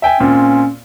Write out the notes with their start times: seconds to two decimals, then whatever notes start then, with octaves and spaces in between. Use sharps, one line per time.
0.02 E5 G5 G#5
0.20 A#2 C4 C#4 F4